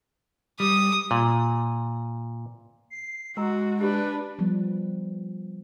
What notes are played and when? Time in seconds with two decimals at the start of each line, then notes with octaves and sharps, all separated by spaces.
0.60 G3 D#6
1.11 A#2
2.90 C7
3.37 G#3 F#4 A#4 A#5
3.81 D4 G4 B4
4.39 F3 G3 B3